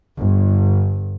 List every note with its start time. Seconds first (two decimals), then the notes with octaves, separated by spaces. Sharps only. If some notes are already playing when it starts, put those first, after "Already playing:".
0.17 G1